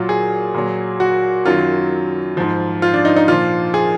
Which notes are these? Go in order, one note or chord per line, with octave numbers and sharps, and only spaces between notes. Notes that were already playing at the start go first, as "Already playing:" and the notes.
Already playing: A#2 F#3 F4
G#4
A#2 F#3
F#4
F#2 D#3 F#3 F4
G#2 F3
F4
D4
D#4
D#4
A#2 F3 F4
G#4